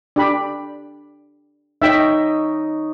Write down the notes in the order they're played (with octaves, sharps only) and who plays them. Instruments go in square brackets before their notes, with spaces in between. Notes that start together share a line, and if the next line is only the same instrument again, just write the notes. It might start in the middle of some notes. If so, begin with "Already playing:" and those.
[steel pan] D4 G4 B5
[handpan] D#4 C#5 D#5 [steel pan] E5 G5